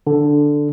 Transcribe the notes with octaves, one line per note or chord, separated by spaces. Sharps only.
D3